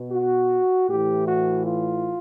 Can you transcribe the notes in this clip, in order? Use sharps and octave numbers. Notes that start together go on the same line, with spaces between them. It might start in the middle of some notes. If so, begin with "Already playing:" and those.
Already playing: B2
F#4
A2 E3 G4
F#4
F4